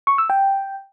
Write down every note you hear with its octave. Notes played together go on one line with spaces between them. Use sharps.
C#6
E6
G5